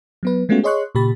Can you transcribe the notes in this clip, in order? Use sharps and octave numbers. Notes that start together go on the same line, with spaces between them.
F#3 B3 B4
G#3 A3 B3 C#4 F4 F#4
G#4 C#5 D#5 C6 C#6 F#6
A#2 C#3 G4 B5 A6